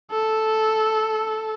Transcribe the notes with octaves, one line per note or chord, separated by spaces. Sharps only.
A4